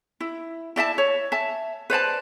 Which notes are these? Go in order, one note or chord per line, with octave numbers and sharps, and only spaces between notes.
E4
E4 D5 E5 A5
C#5
E5 A5
B4 C5 D5 A5